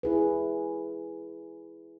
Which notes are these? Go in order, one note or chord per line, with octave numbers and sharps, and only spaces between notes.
E4 G#4 B4